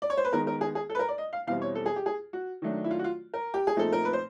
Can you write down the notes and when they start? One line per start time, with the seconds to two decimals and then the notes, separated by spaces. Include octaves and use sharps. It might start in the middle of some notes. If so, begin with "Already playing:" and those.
0.02 D5
0.10 C#5
0.17 C5
0.25 B4
0.32 D#3 G#3 B3 A#4
0.47 A#4
0.61 G#4
0.75 G#4
0.90 A4
0.95 B4
0.99 A#4
1.08 D5
1.18 D#5
1.33 F5
1.47 E2 B2 G3 C4 E4 F5
1.62 C#5
1.75 A4
1.86 G#4
1.96 G4
2.06 G#4
2.33 F#4
2.62 D#3 F#3 A3 D4
2.84 E4
2.91 F4
2.99 F#4
3.04 F4
3.34 A#4
3.54 G4
3.67 G#4
3.76 A#2 F3 A3 C4 D#4 A4
3.93 A#4
4.05 B4
4.13 C5